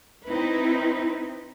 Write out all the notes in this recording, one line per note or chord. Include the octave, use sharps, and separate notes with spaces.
C4 D#4 E4 B4